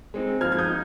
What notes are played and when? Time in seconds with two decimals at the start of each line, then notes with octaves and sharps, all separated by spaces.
0.14 G#3 C4 D#4
0.41 F3 F6 G#6
0.52 G#6
0.58 D#6 G6
0.68 D#4